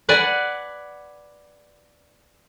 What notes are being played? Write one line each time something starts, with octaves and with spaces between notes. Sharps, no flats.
B4 D5 F#5 G#5